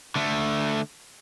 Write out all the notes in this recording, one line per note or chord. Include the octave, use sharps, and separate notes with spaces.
D3 A3